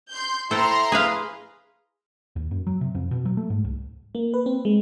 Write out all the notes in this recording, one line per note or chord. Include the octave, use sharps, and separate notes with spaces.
C6 G6
E4 A4 C5 G5 A#5 C6
G#4 B4 F5
D#2
F#2
F#3
C3
F2
B2
F#3
A3
G#2
C2
A#3
B4
C4
G#3